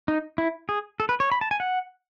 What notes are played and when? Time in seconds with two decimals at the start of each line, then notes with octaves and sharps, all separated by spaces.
0.08 D#4
0.38 E4
0.69 G#4
1.00 A4
1.09 B4
1.20 C#5
1.32 B5
1.41 A5
1.51 G#5
1.60 F#5